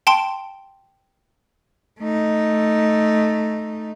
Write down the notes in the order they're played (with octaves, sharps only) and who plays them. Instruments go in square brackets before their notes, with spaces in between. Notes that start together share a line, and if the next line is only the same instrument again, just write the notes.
[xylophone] G5 A5 C6 D7
[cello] A3 D#4